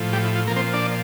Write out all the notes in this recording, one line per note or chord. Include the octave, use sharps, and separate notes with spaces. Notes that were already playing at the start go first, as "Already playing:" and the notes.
Already playing: A2 F3
G3 G4
E4
F4
A#2 F3 A#3 A#4
C4 C5
D4 D5